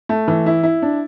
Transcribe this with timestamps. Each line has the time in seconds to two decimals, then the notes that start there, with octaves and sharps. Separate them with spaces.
0.09 A3
0.28 E3
0.46 E4
0.63 E4
0.82 D4